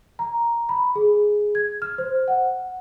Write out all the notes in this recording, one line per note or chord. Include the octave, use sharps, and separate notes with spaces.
A#5
B5
G#4
G#6
F6
C5
F#5